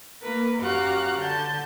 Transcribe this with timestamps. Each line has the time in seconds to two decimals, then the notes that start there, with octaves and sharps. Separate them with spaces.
0.21 A#3 A#4 B4
0.60 F#2 F#4 G4 F5 A#5 F#6
1.18 D3 A5 G6